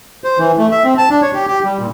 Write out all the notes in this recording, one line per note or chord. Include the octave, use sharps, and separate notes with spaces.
C5
E3
A3
E5
C4
A5
D4
C#5
G4
G4
G3
A#2